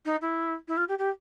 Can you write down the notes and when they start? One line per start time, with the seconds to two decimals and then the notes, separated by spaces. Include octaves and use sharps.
0.05 D#4
0.21 E4
0.68 E4
0.77 F4
0.88 G4
0.98 G4